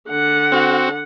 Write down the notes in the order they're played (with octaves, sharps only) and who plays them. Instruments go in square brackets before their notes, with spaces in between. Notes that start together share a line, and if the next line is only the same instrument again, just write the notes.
[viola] D3 F#5
[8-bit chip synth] C4 F#4